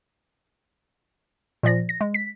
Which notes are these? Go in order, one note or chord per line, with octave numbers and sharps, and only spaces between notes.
A#2 F3 D5 A#6
A#6
G#3
B6